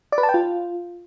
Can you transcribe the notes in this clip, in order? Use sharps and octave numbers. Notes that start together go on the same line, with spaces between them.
D5
B4
A5
G5
F4